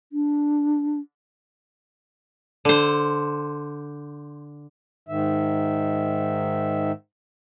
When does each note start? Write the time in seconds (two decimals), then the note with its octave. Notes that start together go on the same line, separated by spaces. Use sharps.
0.12 D4
2.65 D3 C5
5.09 G#2 D#3 E5